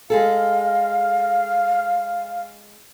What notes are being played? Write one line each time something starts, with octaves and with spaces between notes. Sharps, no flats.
G#3 G#4 A4 F5